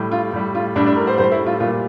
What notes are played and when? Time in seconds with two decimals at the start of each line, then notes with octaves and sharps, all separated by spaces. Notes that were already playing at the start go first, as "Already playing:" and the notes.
Already playing: A2 G3
0.11 F4
0.33 A2 G3
0.55 F4
0.76 A2 G3 D4
0.86 D4
0.96 A#4
1.07 C5
1.18 A2 G3 C5
1.32 E4
1.46 F4
1.60 A#2 G3 F4